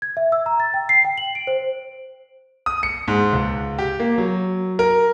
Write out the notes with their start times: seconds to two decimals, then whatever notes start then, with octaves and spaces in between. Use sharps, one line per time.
0.02 G#6
0.17 E5
0.32 E6
0.46 A#5
0.60 A6
0.74 G5
0.89 C7
1.05 G5
1.18 F#7
1.35 D7
1.47 C5
2.66 D#6
2.83 C#7
3.08 G#2
3.33 C#2
3.78 G4
4.00 A#3
4.18 F#3
4.79 A#4